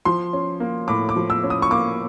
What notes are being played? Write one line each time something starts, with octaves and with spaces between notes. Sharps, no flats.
F3 C6
C#4
A#3
A2 D6
D6
F3
E6
C#4
D#6
C#6
A#3 D6